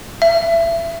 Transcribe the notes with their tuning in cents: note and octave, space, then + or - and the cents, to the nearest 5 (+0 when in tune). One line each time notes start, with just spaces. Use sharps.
E5 +25